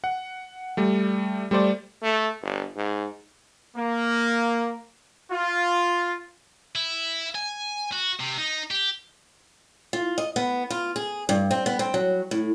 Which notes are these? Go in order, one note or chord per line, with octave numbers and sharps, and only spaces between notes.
F#5
G3 A3
G3 A3 C5 D5
A3
G1
G#2
A#3
F4
E4
G#5
F#4
C3
D#4
G4
F4
D#5
B3
F4
G#4
G2
C4
B3
C4
F#3
A2